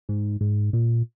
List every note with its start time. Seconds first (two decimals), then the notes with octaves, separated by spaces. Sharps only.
0.09 G#2
0.41 G#2
0.73 A#2